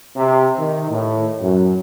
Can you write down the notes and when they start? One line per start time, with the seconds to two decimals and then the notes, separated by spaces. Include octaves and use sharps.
0.17 C3
0.58 D#3
0.90 A2
1.41 F#2